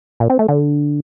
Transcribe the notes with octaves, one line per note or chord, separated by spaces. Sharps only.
A#2
C4
A3
D3